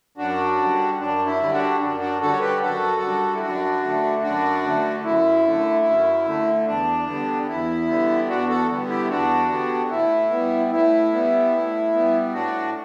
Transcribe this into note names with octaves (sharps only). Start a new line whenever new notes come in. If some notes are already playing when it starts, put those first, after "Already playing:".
F#2 D4 F#4
D3 G3
F#2 D4
E4
D3 G3
D4 F#4
F#2 D4
D4 F#4
D3 G3 F#4 A4
C#5
G4 B4
F#2 F#4 A4
D3 G3
E4
F#2 D4 F#4
D3 A3
F#2 D4 F#4
D3 A3
F#2 E4
D3 A3
F#2
D3 A3
E2 D4
D3 G3 B3
E2 E4
D3 G3 B3
E2 D4 F#4
F#4 A4
D3 G3 B3
E4 G4
E2 D4 F#4
D3 G3 B3
A2 E4
G3 B3
A2 E4
G3 B3
A2
G3 B3
A2 D4 F#4